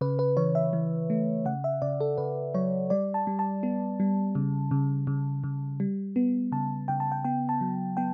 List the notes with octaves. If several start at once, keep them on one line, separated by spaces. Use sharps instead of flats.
C#3 B4
B4
E3 C#5
E5
E3
A3
C#3 F#5
E5
C#3 D5
A4
C#3 B4
F#3 C#5
G3 D5
A5
G3
A5
B3
G3
C#3
C#3
C#3
C#3
G3
B3
C#3 A5
C#3 G5
A5
G5
B3 G5
A5
F#3
B3 G5